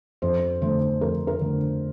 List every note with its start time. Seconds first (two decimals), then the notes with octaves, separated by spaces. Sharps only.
0.22 F2 C5
0.62 D3 A3 C5
1.01 F2 A#4
1.27 A#4
1.41 D3 A3